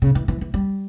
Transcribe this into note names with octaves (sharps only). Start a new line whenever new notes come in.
C#3
E3
E3
E3
G3